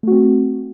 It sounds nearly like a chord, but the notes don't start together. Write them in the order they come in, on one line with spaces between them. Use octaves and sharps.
A3 F#4 C4